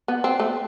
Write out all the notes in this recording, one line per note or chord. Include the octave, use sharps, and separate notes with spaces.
B3
C4
A3